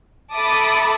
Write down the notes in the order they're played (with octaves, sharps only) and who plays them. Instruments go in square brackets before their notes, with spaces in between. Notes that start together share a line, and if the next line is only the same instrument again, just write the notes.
[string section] A4 E5 A5 B5 D6 D#6